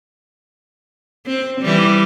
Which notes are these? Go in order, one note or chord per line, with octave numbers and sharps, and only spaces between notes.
C4
E3 G3